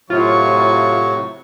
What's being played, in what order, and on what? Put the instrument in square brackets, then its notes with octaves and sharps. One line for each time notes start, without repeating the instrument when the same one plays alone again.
[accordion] A2 C3 F#3 [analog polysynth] F4 [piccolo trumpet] C#6